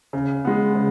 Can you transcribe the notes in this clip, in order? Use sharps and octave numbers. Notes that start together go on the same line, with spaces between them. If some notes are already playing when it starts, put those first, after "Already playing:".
C#3
G#3 B3
C#3